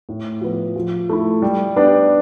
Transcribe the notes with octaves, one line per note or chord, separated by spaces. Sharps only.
A2
F3 B3
F3
A3 E4
G3
B3 D4 G4 D5